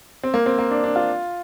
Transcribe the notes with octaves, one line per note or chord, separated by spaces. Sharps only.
C4
A#3
C4
A#3
D4
D4
F4